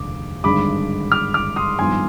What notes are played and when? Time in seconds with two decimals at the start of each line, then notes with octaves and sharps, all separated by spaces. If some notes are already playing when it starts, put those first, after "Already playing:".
Already playing: F1 D#2 D3 G#3 D6
0.44 G#1 G2 D3 G#3 D4 B5 D6
1.12 D6 F6
1.34 D6 F6
1.56 C6 D#6
1.79 G#1 G2 F3 B3 D#4 G#5 C6